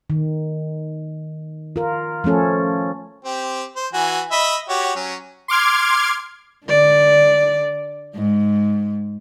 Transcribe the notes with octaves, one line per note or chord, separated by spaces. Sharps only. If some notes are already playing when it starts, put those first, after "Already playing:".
D#3
F4 A#4
F3 A3 C#4 A4
C4 G4
C5
E3 F#4 G#5
D#5 E5 B5
F#4 G4 C#5
F#3 C#4
C6 D6 F6 G#6
D3 D5
G#2